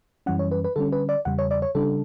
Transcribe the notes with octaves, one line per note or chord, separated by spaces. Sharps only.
F#2 E3 G3 C#4 F#5
C#5
B4
B4
D3 G3 C#4 A4
B4
D5
E2 C#3 G3 F#5
C#5
D5
C#5
C#3 G3 D4 A4